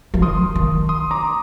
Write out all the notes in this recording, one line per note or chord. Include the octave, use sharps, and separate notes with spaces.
F3
D#3 C6 D#6
D#3
C6 D#6
A#5 D6